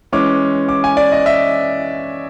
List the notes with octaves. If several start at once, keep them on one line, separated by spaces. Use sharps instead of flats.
E3 G#3 C#4 D6
D6
G#5
D5
D#5
E5